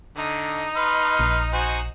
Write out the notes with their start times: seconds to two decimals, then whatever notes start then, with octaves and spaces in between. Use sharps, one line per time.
0.17 D3 D#4
0.76 B4 C6 F6
1.19 A#1
1.53 F#4 C5 G#5